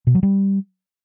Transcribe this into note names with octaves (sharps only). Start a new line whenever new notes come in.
B2
F#3
G3